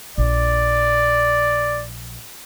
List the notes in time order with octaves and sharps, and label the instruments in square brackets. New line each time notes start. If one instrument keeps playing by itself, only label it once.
[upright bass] A#1 [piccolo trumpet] D5